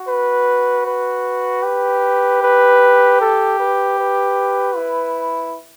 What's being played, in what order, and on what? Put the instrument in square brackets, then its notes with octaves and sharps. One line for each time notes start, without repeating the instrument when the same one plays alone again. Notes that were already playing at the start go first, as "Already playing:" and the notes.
Already playing: [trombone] F#4
[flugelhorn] B4
B4
[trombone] G4
[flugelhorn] B4
A4
B4
B4
[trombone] E4